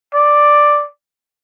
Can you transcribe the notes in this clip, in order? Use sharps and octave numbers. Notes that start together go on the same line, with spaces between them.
D5